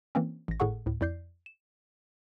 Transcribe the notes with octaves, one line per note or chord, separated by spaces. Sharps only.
E3 A#3 C4 C#4
A1 A#6
G#1 A2 G#4 A4 F#5 C#6
D2 A2
F2 E4 D5 G6 C7
E7